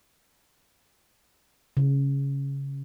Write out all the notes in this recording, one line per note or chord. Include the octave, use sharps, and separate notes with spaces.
C#3